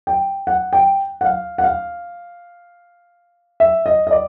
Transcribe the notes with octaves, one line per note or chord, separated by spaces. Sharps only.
G5
F#5
G5
F#5
F5
F#5
F5
E5
D#5
D#5
D5